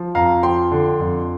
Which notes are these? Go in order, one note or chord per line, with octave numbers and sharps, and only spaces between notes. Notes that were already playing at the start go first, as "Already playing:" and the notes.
Already playing: F3
F2 F5 A#5
F3 G5 C6
D3
F2